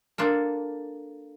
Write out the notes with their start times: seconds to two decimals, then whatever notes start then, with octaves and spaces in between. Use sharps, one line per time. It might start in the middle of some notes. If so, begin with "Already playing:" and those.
0.18 A#3 D4 F4 A4